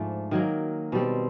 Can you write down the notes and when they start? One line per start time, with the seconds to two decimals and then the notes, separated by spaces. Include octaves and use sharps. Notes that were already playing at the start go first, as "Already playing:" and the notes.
Already playing: G#2 F3 A3 D4
0.31 D#3 F#3 A#3
0.92 B2 G3 C4